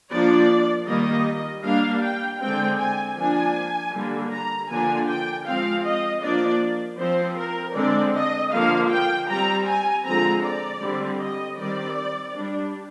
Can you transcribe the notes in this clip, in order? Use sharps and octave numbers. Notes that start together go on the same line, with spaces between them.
F3 A#3 D4 D5
D#3 G3 A#3 D#5
G3 A#3 D4 F5
G5
D3 G#3 C4 G5
G#5
F3 A#3 D4 G#5
D3 G3 A#3 D4
A#5
D3 F3 A#3 D4 G#5
G5
F3 G#3 C4 F5
D#5
F3 A#3 D4 D5
F3 C4 C5
A#4
D3 G#3 C4 D5
D#5
D3 F3 A#3 F5
G5
G3 C4 A#5
G#5
D3 F3 G#3 C4 A#5
D5
D3 G3 C4
D#5
D#3 G3 C4 D5
G3 D4